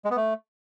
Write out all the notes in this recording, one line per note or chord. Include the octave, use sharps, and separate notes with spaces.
G#3
B3
A3